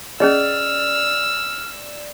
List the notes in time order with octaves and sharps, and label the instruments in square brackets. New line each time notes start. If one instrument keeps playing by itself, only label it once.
[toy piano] C#4 G#4 D#5 [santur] D5 [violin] E6 [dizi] F6